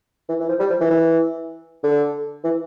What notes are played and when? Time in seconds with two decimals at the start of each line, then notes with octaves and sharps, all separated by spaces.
0.29 E3
0.40 E3
0.49 F3
0.60 G3
0.70 F3
0.81 E3
0.91 E3
1.83 D3
2.44 E3